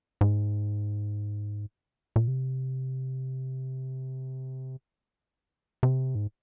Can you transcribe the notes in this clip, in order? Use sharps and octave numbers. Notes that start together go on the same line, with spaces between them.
G#2
A#2
C3
C3
G#2